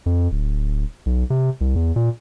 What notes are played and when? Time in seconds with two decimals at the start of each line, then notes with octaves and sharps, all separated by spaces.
0.06 F2
0.32 D1
1.06 B1
1.30 C3
1.61 C2
1.76 E2
1.96 A#2